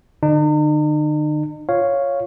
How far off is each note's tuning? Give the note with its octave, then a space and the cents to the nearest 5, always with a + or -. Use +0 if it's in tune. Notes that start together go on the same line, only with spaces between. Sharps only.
D3 +35 D#4 -45
F4 +0 C#5 +0 F5 +0